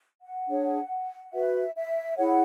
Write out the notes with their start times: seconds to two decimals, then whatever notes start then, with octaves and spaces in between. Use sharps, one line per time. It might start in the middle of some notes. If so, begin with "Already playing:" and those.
0.21 F#5
0.49 D4 G#4 C#5
1.33 F#4 B4 E5
1.75 E5
2.17 E4 G#4 C#5 F#5